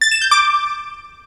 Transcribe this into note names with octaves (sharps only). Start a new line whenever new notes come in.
A6
E7
G6
D6